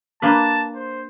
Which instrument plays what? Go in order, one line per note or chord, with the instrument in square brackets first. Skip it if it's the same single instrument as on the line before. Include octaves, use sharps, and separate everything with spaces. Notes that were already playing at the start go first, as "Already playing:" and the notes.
[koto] A#3 D4 B4 [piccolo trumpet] A5
[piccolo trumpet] C5